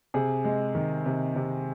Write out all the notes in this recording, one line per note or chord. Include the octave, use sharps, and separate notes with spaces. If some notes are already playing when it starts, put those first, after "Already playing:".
C3 G#4
G#3
D#3
C3
C3